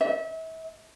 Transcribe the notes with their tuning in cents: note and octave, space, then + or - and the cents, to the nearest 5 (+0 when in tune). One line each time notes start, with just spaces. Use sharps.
E5 -35